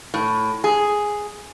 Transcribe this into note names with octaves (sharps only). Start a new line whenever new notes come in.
A2
G#4